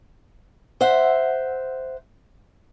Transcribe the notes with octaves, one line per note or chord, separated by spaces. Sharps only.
C5 E5 F#5